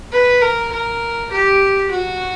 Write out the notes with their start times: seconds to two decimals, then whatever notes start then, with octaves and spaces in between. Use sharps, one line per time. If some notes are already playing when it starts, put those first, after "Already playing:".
0.12 B4
0.42 A#4
0.72 A#4
1.32 G4
1.91 F#4